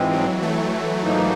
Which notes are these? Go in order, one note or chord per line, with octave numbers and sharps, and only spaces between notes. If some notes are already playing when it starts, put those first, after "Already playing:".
Already playing: G#2 E3 F3 G#3 C4
F#3
A3
G#2 F3 A#3 D#4